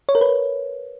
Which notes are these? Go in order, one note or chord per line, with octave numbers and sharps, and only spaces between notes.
C#5
A#4
B4